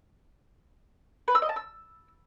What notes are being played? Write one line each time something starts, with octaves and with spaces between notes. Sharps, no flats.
B4
E6
D#5
A5
E6